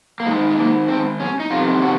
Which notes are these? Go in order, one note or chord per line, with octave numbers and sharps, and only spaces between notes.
A#3
G#2 D#3 G#3
G#3
A#3
C4
C#4
D#4
F2 C3 D#3 F4
F#4